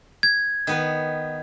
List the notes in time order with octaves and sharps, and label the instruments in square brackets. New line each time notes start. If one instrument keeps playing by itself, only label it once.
[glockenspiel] G#6
[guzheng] D#3 B3 B4